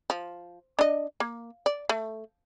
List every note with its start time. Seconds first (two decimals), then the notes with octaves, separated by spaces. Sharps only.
0.10 F3
0.79 D4 D#5
1.20 A#3
1.66 D5
1.89 A3